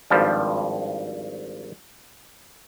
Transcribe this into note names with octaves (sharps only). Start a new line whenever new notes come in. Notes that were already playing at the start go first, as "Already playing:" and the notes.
G#1 G2 F3 G3